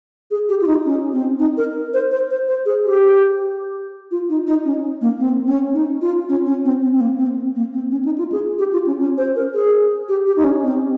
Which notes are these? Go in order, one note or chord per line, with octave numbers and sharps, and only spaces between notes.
G#4
G4
F4
D#4
C#4
C4
D#4
A#4
C5
C5
C5
C5
G#4
G4
F4
D#4
D#4
C#4
A#3
C4
C#4
D#4
F4
C#4
C#4
C4
C4
C4
A#3
C4
A#3
C4
C#4
D#4
F4
G#4
G4
F4
C#4
C#4
C5
A#4
G#4
G4
G4
D#4
C#4
C4